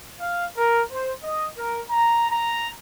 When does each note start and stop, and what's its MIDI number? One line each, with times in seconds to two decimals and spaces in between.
0.20 0.45 77
0.56 0.82 70
0.91 1.11 72
1.24 1.46 75
1.58 1.80 70
1.89 2.27 82
2.30 2.70 82